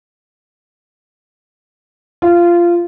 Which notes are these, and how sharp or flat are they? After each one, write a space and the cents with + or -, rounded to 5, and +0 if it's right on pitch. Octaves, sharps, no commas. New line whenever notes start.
F4 -15